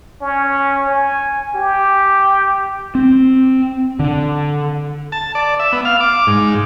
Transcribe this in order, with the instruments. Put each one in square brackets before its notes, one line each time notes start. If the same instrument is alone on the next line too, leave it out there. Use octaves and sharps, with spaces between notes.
[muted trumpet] C#4
G#5
G4
[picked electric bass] C4
D3
[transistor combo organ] A5
D5
E5
B3
F5
D6
G#2